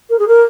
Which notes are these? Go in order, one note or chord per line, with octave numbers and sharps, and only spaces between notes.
A#4
G#4
A#4